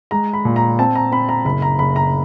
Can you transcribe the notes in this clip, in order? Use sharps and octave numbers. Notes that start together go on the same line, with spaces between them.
G#3 A#5
B5
A#2
A#5
C4 A5
A#5
C4 B5
A#5
F#1 B5
A#5
F#1 B5
A#5